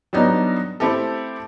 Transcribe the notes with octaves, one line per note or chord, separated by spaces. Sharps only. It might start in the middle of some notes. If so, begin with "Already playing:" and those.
F#3 G3 B3 D4 D#4
A3 C4 E4 G4 A4